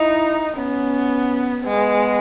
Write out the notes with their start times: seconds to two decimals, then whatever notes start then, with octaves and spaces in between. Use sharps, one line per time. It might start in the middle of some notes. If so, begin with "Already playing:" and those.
Already playing: D#4 E4
0.56 B3 C#4
1.64 G#3 B3